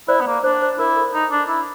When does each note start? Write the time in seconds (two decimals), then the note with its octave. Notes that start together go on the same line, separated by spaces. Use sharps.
0.08 E4 C5 D5
0.21 B3
0.27 A#3
0.44 D4 C5
0.62 C5
0.79 E4 A#4
0.96 A4
1.14 D#4
1.31 D4
1.48 E4